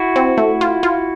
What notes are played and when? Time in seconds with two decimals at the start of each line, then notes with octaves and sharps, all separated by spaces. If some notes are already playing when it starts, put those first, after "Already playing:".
Already playing: E4 F#4
0.16 C4
0.37 A3
0.61 F4
0.83 F4